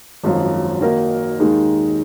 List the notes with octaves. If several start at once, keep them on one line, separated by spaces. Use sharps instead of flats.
G#1 F#2 F3
D#3 A#3 D#4 F#4 A#4
D#2 D#3 G#3 D#4